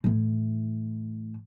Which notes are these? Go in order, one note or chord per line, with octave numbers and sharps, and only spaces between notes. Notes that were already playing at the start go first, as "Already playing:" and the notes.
A2 E3